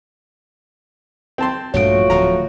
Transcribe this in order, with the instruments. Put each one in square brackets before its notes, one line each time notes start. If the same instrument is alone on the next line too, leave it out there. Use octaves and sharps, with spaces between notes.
[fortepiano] C4 A5 C6
[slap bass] A#1 G2 F3 [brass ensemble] A3 F4 F#4 [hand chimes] C#5 D7
[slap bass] D1 F3 [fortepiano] A#5